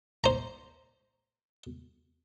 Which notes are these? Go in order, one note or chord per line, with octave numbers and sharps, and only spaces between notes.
C5 A#5